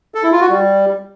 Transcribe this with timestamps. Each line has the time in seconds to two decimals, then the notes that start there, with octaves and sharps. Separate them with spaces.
0.15 A4
0.23 E4
0.32 F4
0.41 F#4
0.50 G3